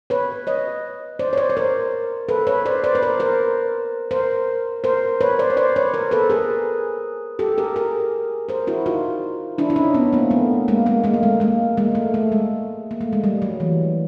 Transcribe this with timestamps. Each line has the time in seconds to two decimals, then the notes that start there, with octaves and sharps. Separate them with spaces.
0.10 B4 C#5
0.47 C#5 D#5
1.19 C5 D5
1.33 C#5
1.37 C5 D5
1.50 C#5
1.57 A#4 C5
2.29 A4 B4
2.47 B4 C#5
2.66 C5 D5
2.84 C5 D5
2.95 B4
3.03 A#4 C5
3.20 A#4 C5
4.11 A#4 C5
4.84 A#4 C5
5.21 B4 C#5
5.39 C5 D5
5.50 C#5
5.57 C5 D5
5.76 B4 C#5
5.94 A#4 C5
6.11 A4 B4
6.30 G#4 A#4
7.39 G4 A4
7.58 G#4 A#4
7.76 G#4 A#4
8.49 A#4 C5
8.67 E4 F#4
8.86 D#4 F4
9.58 D4 E4
9.70 E4
9.76 C#4 D#4
9.94 B3 C#4
10.13 A#3 C4
10.31 A3 B3
10.68 G#3 A#3
10.86 G#3 A#3
11.04 G#3 A#3
11.14 A3
11.23 G#3
11.40 G#3 A#3
11.77 G#3 A#3
11.95 A3
12.14 A3
12.32 G#3
12.91 A#3
13.01 A3
13.13 G#3
13.24 G3
13.42 F#3
13.60 E3